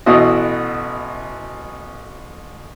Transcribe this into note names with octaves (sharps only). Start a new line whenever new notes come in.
A1 B2 E4 F#4 D#5